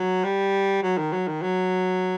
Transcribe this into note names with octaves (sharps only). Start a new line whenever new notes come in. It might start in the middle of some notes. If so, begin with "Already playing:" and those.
Already playing: F#3
G3
F#3
D#3
F#3
D#3
F#3